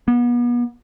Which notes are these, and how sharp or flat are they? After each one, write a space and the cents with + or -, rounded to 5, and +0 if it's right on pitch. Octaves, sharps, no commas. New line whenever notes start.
B3 -35